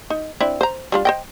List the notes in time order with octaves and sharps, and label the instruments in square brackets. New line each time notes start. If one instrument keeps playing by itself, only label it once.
[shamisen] D#4
C4 D4 E4
C5 A#5
G3 D4 F4
C5 D#5 G5